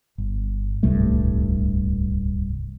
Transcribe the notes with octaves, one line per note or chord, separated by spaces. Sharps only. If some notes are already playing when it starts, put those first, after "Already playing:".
G1
D1 C2 G2 A3